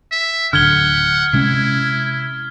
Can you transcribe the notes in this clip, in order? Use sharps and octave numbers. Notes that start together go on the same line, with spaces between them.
E5
D1 G#1 D3 F#5 F6 G#6 G7
C3 G#3 C#4 E4